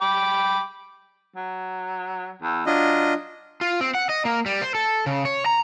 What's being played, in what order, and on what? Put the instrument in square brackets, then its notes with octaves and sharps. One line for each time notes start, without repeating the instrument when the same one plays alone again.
[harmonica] G5 B5 D6
[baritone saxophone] F#3
E2
[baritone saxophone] F#3 [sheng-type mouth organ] D4 F4 D#5
[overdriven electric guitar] F4
C4
F#5
D#5
A#3
G3
C5
A4
C#3
C#5
A#5